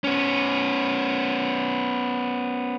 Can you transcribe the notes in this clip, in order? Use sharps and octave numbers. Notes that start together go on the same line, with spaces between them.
B3 C#4